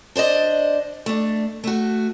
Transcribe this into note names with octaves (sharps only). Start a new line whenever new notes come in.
D4 C5 D5 D#5
A3 D4
A3 F#4